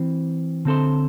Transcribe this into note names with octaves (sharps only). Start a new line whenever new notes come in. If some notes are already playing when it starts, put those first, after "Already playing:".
Already playing: E3 C4
D3 C4 A4 C5